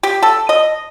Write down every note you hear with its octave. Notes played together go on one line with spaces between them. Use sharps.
G4
A4
D#5